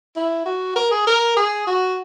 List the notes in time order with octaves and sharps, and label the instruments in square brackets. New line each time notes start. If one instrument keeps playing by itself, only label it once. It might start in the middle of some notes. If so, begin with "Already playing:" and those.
[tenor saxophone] E4
F#4
A#4
G#4
A#4
G#4
F#4